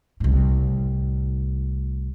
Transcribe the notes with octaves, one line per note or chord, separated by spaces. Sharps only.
C2 A2